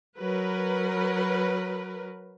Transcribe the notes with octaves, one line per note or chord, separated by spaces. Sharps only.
F#3 A#4 B4